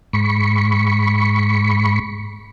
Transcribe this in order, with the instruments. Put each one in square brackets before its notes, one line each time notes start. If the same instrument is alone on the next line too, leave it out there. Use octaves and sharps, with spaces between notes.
[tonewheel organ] G#2 B5 C#6